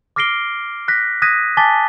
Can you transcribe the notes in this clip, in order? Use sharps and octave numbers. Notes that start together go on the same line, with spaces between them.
D6 F6 A#6 C7 D7 G7
F#6 A#6 B6
D#6 F#6 G#6 A#6 B6 D#7
G#5 A5 D6 A6 B6 G7